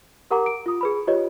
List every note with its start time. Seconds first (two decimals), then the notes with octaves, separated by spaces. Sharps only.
0.31 G4 A#4 F#5 A#5 D6
0.46 D7
0.66 F4 D#6
0.81 G#4 B4 B5
1.07 F4 G4 B4 C#5 D#5